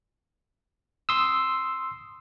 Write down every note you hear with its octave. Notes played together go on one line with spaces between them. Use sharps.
C6 D#6 E6